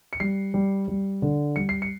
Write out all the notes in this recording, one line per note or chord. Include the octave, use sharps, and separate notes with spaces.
C#7
G3 C7
G3
G3
D3
G3 C#7
C7
C#7